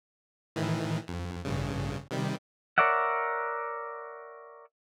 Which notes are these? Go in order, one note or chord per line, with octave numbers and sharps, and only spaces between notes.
A2 D#3 E3
F2
A1 G2 C#3
C3 D#3 G3
A#4 C#5 D5 E5 F#5